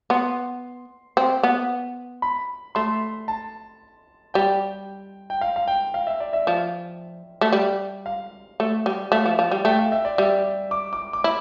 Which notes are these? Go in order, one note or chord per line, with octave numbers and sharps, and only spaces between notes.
B3 C6
C4
B3
B5
A3 C6
A5
G3 G5
G5
F5
F5
G5
F5
E5
D5
E5
F3
A3
G3
F5
A3
G3
A3 F5
F3
F3
G3
A3 G5
F5
E5
D5
G3 E5
D6
D6
D6
E4